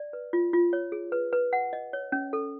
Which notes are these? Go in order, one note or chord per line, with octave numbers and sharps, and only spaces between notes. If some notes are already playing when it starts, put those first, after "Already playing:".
Already playing: D5
B4
F4
F4
C#5
G#4
B4
B4
F#5
D#5
C#5
C#4
A4